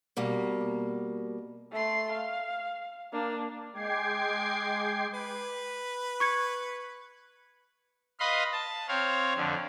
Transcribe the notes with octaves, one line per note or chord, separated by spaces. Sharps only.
B2 G3 A#3
A3 C6
F5
A#3 D4
G#3 G5 D6 G#6 C7
B4
C#6 G#6 C#7
B4 D#5 F5 B5 C6
A5
C4 C#5 F5
F2 D3